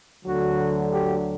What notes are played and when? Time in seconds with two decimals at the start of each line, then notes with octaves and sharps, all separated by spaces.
0.25 D2 D3 F#3 F#4
0.92 G4